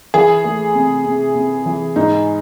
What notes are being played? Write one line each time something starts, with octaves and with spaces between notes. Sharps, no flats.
E3 G#4
A3
C3
C3
C3
E3
G#2 D#4